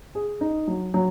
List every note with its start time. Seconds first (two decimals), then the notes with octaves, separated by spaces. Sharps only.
0.15 G#4
0.41 D#4
0.68 F#3
0.94 F#3